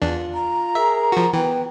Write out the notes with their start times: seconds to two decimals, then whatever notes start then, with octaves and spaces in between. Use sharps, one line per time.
0.02 E2 D4 F4
0.34 A#5
0.75 G#4 A#4 E5
1.12 F3 F#4
1.33 E3 B3 G5